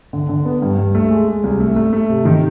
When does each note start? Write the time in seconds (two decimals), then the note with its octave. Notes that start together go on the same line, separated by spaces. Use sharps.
0.13 D3
0.29 D3
0.45 B3
0.62 G2
0.78 G2
0.95 A3
1.11 G#3
1.28 G#3
1.44 C2
1.60 A3
1.76 A3
1.93 A3
2.09 C3
2.25 D#3